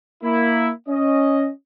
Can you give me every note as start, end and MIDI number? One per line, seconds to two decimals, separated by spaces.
0.23 0.70 58
0.23 0.70 64
0.88 1.49 61
0.88 1.49 75